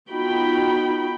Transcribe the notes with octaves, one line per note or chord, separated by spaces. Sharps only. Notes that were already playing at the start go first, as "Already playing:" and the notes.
B3 D#4 F4 F#4 G5 B5